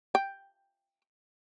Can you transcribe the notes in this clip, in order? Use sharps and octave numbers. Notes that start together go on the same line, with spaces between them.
G5